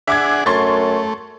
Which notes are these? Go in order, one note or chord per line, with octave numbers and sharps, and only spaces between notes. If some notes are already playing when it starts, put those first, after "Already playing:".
D4 G#4 E5 F#5 D6 G#6
F#2 A3 C6 C#6 A6